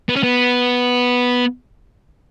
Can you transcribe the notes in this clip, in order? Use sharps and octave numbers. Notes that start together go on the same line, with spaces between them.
B3
C#4
B3